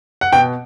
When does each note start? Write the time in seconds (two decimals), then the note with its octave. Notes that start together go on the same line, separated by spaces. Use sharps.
0.21 F#5
0.32 B2 G5